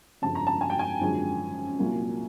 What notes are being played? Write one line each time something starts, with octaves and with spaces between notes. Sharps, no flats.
G1 F2 C#3 A5
A#5
A5
G#5
G5
G#5
G#1 F#2 D3 F3 G#3
C2 A#2 F#3 A#3